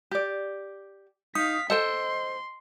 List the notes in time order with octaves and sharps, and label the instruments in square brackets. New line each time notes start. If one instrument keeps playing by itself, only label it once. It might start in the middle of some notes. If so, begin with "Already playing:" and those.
[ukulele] G4 D5
[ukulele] D#4 [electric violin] F5 B6 [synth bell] D#6
[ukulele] A4 C5 G5 [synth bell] D#5 [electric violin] C6